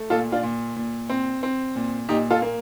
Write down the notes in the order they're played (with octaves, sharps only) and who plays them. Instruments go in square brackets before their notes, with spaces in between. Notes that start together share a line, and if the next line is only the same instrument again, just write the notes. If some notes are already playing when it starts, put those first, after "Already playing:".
Already playing: [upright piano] A3
A#2 F4 A4
D4 F4
A#2
A#2
C4
C4
A#2
A#2 D#4 G4
F4 A4
A#3